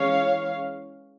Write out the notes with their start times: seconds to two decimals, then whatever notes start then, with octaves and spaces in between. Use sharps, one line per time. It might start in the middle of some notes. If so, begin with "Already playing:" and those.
Already playing: E3 G#3 C#4 C#5 F5